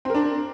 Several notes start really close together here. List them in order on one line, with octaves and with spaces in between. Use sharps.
C4 A#4 D4